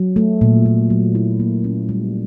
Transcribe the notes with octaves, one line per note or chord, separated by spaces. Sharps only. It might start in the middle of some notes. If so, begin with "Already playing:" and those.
Already playing: F#3
A3
A#2
A#2
F#3
E4
A#3
C#4
G3